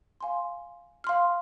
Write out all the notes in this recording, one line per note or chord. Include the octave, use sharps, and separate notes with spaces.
F5 G#5 C6
F5 C6 F6